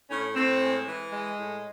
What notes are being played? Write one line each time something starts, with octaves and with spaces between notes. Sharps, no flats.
A2 C#4
A2 C4
G#3
E3
G#3
A2